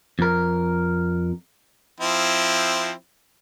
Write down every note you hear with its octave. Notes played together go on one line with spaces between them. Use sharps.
F2 A#4
F3 C4 E4